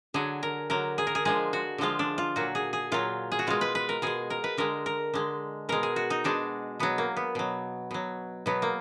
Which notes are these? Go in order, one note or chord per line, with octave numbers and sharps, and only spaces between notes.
D3 F#3 G#4
A#4
D3 F#3 A#4
G#4
A#4
G#4
D3 F3 G#3 G#4
F#4
D3 F3 G#3 F4
D4
F4
A#2 F#3 F#4
G#4
G#4
A#2 F#3 F4
G#4
F#4
B2 G#3 F4
B4
B4
A#4
B2 G#3 G#4
A#4
B4
D3 G#3 A#4
A#4
D3 G#3
B2 G#3 A#4
G#4
F#4
D#4
B2 G#3 D4
B2 F#3 B3
A#3
B3
B2 F#3
B2 F#3
B2 F#3 B3
A#3